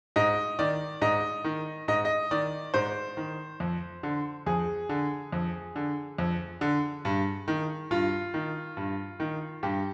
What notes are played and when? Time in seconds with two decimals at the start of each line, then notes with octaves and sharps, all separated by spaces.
0.16 G#2 D#5
0.59 D#3 D5
1.01 G#2 D#5
1.44 D#3
1.88 G#2 D#5
2.05 D#5
2.31 D#3 D5
2.74 G#2 C5
3.17 D#3
3.60 F2
4.03 D3
4.46 F2 G#4
4.89 D3
5.32 F2
5.76 D3
6.18 F2
6.61 D3
7.05 G2
7.48 D#3
7.91 G2 F4
8.34 D#3
8.77 G2
9.20 D#3
9.63 G2 G4